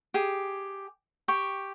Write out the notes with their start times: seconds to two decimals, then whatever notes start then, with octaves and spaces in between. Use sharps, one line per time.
0.14 G4 G#4
1.28 G4 G5 C#6